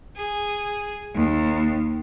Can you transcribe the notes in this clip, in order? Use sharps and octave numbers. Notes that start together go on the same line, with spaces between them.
G#4
D#2